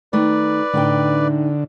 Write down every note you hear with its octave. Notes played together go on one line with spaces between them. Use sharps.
D#3 A3 B4 D5
A2 D3 D#4 G5